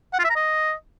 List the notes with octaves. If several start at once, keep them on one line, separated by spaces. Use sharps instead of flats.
F#5
F4
E5
A#5
D#5